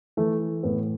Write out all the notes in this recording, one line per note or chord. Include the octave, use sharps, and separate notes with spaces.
E3 A3
A2 B3